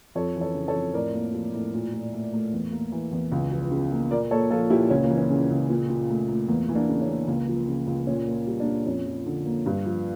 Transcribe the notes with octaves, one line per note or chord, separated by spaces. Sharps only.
F2 A4 C#5
E3
A4 C#5
C#3
A4 C#5
F2
A2 A#4 D5
A#3
F3
A2
A#2
A#2
A3
A3
E2
A#3
E3
E2
C#2
F3
C#3
A#3
A#2 A#4 D5
A#3 A4 C#5
F3 F4 A4
A#2 E4 G4
C#2 C#4
A#3
E3
C#4
C#3
C#2
A#2
A#2
A3
A3
E2 A#3
E3
A#3 D4
C#3
C#4
A#3
C#2 A#3
F3
C#3
C#2
A#2 C#4
A#3
G3
A#3 D4
A#2
F2 C#4
F3
D3
A#3
G2
F3